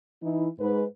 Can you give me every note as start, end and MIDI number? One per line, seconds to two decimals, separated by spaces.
0.23 0.47 52
0.23 0.47 63
0.23 0.47 64
0.59 0.83 44
0.59 0.83 71